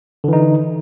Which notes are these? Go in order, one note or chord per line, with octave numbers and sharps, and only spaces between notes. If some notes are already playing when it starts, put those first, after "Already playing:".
D3 E3 D#4